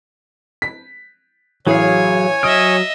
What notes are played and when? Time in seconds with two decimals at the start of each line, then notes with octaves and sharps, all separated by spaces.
0.62 B6
1.67 A1 F#3 G#4 C#5 F5 G#5
2.43 F#3 D#5 E5 D#6 F6 D7